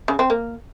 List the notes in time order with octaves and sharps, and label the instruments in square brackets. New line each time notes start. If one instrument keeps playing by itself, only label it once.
[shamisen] C#3
C4
A#3